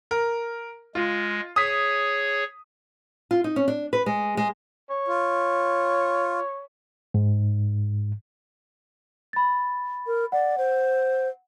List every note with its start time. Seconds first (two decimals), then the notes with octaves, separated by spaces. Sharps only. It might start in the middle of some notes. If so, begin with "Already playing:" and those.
0.11 A#4
0.95 G#3 F4
1.56 G#4 C#5 D#6 B6
3.31 F4
3.44 D#4
3.56 C#4
3.68 D4
3.93 B4
4.06 G#3
4.37 G#3
4.90 C#5
5.08 F4
7.14 G#2
9.33 B5 A6
10.06 A#4
10.32 D5 F#5
10.57 C5